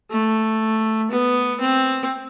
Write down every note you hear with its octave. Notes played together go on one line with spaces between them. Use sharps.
A3
B3
C4